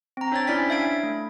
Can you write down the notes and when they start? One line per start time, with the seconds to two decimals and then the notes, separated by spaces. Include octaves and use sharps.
0.17 C4 A#5
0.32 D4 C5 C#5 G5 A6
0.47 C#4 E4 D5 G#5 B6
0.69 D4 E5 F5 G#6 D7
1.03 A3